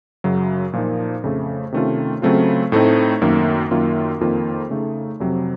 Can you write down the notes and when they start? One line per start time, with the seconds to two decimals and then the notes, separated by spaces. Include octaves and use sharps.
0.24 F#2 C#3 F#3
0.73 A#2 F3 A#3 D#4
1.24 F2 C#3 A3
1.72 C3 D#3 A3 C#4 F4
2.22 C#3 F#3 A3 C4 F4
2.72 A2 A3 C4 D#4
3.22 F#2 D#3 A#3
3.71 F#2 D#3 A#3 F4
4.21 F2 D#3 A#3 F4
4.70 C#3 A3 D#4
5.20 F2 C3 F#3